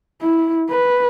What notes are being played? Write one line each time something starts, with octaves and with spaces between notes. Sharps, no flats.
E4
B4